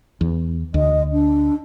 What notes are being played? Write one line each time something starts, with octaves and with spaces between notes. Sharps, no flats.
E2
D2 D#5
D4